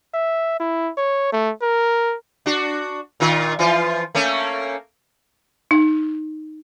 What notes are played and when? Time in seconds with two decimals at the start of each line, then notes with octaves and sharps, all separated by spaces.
0.14 E5
0.60 E4
0.97 C#5
1.32 A3
1.62 A#4
2.46 D4 F#4
3.20 A#2 D#3 F4
3.59 E3 F3 F4
4.15 A3 A#3 C#4
5.71 D#4